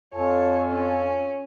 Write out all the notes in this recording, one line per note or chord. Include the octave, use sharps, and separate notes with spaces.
F2 F4 A4 C#5 G#5
C#4